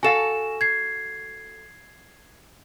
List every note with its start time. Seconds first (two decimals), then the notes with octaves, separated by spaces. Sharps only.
0.03 F#4 A4 F5 G#5 E7
0.61 G#6 C7